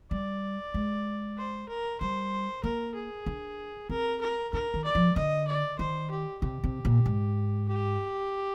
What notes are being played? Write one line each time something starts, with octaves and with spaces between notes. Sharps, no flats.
G3 D5
G#3
C5
A#4
G3 C5
A#3 A#4
G#4
D4
C4 A#4
A#4
D4 A#4
D#3
D5
F3
D3 D#5
D5
D#3 C5
G4
C3 G4
C3
A#2
G#2
G4